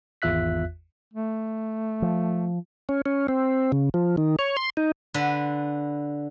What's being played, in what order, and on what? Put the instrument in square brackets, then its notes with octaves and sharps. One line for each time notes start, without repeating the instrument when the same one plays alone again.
[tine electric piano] G#1 E2 F4 E5 F#6 B6
[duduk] A3
[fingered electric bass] F3
[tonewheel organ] C#4
C#4
C4
C#3
F3
D#3
C#5
C6
D#4
[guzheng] D3 B4